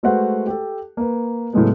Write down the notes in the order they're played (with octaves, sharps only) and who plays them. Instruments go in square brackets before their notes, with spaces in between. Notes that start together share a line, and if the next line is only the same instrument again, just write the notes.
[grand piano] G#3 A3 F#4 B4 C5 F#5
G4 A4
A#3 B4
A2 C#3 F#3 G#3 A3 B3